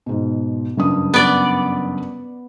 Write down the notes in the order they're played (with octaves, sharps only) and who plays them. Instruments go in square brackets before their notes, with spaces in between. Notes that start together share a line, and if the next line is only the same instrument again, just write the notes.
[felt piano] G#2 B2
F#1 G2 D#6
[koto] B3 D5